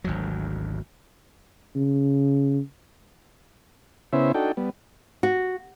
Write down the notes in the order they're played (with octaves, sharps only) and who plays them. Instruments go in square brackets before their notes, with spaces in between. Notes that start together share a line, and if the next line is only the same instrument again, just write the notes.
[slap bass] G#1 D2 F#3
[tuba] C#3
[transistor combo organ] C#3 B3 C#4 E4 C5 E5
D4 D#4 F#4 A4 G5
G3 B3
[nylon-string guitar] F#4